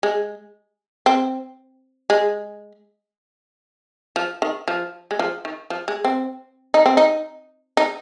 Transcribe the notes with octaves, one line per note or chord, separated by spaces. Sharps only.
G#3
C4
G#3
F3
D#3
F3
G#3
F3
D#3
F3
G#3
C4
D#4
C4
D#4
D#4